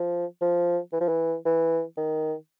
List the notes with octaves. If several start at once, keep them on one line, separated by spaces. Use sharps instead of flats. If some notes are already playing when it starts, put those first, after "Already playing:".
Already playing: F3
F3
E3
F3
E3
E3
D#3